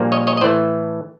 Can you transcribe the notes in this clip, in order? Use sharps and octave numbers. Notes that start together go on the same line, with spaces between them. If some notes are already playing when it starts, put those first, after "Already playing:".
Already playing: A#1 A#2 G3 A#3
C#5 D#5
C#5 D#5
D#5
A2 E3 A3 C5 D5